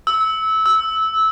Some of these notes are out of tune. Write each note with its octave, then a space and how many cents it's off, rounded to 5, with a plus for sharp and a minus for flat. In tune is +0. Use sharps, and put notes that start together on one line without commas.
E6 -20
E6 -15